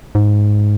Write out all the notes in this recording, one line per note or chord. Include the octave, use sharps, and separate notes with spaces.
G#2